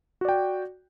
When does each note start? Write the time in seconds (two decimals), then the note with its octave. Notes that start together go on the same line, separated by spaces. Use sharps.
0.21 F#4
0.25 D5
0.29 G5